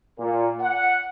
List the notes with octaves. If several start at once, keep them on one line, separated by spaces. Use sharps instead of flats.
A#2
F#5